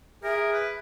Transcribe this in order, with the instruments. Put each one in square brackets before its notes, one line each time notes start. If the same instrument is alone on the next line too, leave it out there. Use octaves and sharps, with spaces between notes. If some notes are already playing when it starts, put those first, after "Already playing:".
[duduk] G#4 [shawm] A#4 [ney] E5
[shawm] B4